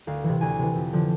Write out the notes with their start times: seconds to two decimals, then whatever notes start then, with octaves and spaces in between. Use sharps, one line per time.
0.07 D2 F5
0.24 E3
0.29 C3
0.41 D2 G#5
0.59 C3 E3
0.75 F2
0.93 D3 F3